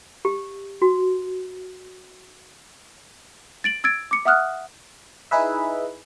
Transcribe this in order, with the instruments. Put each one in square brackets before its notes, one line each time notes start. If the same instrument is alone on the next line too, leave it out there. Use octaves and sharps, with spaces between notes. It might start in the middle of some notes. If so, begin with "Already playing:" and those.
[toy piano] G4
F#4
[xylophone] A6 D7 F#7
E6 G#6 A6 D7
D6 C#7
E5 F#5 D#6 F6 F#6
[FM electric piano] D#4 E4 G#4 B4 E5